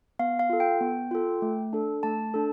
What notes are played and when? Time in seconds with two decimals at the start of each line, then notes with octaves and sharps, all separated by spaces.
0.19 B3 F5
0.39 F5
0.50 F4 A4
0.60 G5
0.81 B3
1.11 F4 A4
1.42 A3
1.73 D4 A4
2.03 A3 A5
2.34 D4 A4